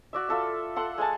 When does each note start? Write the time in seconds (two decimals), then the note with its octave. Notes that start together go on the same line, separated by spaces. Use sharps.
0.13 F#4 D5 E5
0.29 F4 A4 E5
0.76 A4 F#5 C6
0.98 G#3 G#5 A5